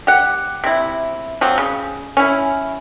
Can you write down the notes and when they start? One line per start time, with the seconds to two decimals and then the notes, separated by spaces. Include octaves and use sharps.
0.07 G4 F#5
0.64 C3 E4
1.41 F3 F#3 C4
1.58 C#3
2.17 C#4 E4